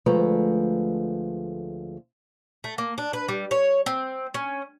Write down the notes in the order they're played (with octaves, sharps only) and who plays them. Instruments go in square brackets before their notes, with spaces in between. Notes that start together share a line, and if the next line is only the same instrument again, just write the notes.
[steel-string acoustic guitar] D2 F3 G#3 A3 B4 A#5
[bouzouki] A3
A#3
D4
B4
G3
C#5
C4
C#4